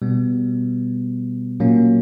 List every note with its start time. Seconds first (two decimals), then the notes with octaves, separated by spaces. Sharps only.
0.02 B2 G3 B3
1.60 A#2 F#3 A#3 C#4